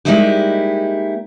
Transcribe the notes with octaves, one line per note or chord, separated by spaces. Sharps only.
G3 G#3 A#3 D#4 E4 G4